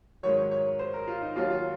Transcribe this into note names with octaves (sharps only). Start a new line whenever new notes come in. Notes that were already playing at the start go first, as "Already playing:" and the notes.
G#2 D#3 F#3 C#5
C#5
C#5
C5
A#4
F4
D#4
D#2 D#3 F#3 F4
F4